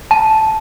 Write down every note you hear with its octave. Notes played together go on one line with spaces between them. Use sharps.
A5